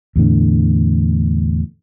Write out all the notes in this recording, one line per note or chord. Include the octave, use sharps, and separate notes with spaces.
E2 A2 D3